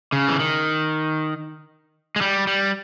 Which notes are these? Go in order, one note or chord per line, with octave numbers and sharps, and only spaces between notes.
C#3
E3
D#3
G#3
G3
G3